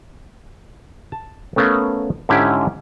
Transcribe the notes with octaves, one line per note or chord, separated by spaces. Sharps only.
A5
A3 B3 C#4 A#4 F5
G#2 D3 C#4 E4 G4